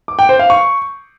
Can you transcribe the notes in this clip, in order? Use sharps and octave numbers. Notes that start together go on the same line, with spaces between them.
D6
G5
C5
F5
C#6